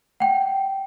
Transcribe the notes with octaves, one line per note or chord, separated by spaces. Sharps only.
F#5 G5